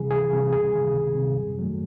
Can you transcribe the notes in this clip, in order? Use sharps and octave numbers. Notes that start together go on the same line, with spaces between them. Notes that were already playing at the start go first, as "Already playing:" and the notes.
Already playing: C3 E3 G3 G#4
C#2 G#4
C3 E3 G3
C#2 G#4
C3 D#3 G3
C#2
C3 D#3 G3
F#2
D#3 F#3 A3